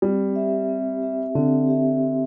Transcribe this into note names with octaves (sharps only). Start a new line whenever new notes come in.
G3 C4
G4 E5
C4
G4 E5
D3 C4
G4 E5
C4